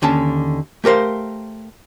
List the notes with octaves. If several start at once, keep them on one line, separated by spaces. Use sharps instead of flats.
D#2 D3 C#4 A5
A3 G4 A#4 C5 F5